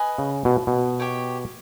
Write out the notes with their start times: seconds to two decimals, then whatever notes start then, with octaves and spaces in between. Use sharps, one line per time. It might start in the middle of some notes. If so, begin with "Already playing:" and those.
Already playing: B4 D#5 G#5
0.18 C#3
0.45 B2
0.67 B2
1.00 G4 C#5 G5